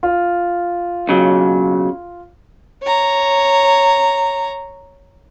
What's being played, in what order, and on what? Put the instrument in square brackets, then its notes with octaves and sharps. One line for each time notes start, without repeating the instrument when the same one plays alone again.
[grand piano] F4
[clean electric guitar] B1 C#3 F#3
[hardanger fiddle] C#5 A#5